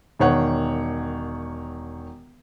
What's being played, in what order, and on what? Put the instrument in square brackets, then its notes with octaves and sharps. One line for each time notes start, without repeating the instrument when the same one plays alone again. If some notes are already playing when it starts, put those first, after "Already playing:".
[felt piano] E1 D#3 C#5 F#5